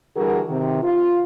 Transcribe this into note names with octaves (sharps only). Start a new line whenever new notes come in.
D3 E3 G3 F#4 G#4 A#4
C3 D#3
F4